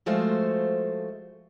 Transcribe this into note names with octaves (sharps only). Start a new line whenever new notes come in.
F3 G#3 A3 F#4 C5 F5